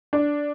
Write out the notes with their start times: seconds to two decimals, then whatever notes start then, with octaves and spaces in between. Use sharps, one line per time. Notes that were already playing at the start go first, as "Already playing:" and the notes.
0.13 D4